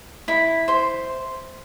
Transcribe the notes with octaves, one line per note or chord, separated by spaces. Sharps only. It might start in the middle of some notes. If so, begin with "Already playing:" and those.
E4 B5
C5 C6